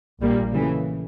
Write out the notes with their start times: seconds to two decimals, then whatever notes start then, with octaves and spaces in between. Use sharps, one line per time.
0.20 A#1 A#2 G3 A#3
0.53 C#3 E3 A3